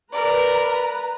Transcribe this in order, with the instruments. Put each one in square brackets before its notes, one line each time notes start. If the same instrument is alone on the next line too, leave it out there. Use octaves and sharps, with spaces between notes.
[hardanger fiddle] A#4 D5 [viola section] B4 A#5